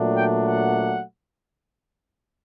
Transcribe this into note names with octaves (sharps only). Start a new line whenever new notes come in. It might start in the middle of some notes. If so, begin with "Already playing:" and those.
Already playing: A#2 F#3 A3 D4
G5
F#5